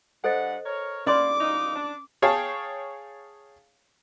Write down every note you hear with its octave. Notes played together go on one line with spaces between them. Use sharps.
G2 A4 C5 D#5 F#5
A#4 C#5
A#3 C#4 D5 B5 C6 D6
A#3 D#4
D4
G#4 C#5 F5 G5 A5